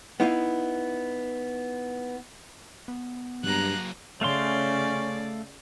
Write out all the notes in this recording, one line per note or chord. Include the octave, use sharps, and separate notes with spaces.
B3 D#4 E4 F5
B3
G2 F#3 A#3 A#5 F#6
C#3 A3 C#4 D5 F5 C6